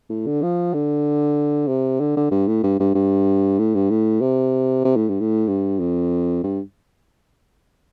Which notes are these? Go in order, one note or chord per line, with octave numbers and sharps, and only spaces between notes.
A2
D3
F3
D3
C3
D3
D3
G2
A2
G2
G2
G2
A2
G2
A2
C3
C3
A2
G2
A2
G2
F2
G2